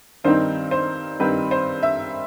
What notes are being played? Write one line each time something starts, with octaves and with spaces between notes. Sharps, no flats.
G2 D#3 G3 C4 D#4 C5
C5
G2 D#3 G3 C4 D#4 B4
C5
E5